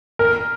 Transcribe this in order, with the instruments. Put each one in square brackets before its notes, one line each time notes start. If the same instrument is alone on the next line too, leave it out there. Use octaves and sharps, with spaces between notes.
[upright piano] A#4